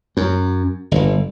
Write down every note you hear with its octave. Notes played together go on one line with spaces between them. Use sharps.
F#2
G1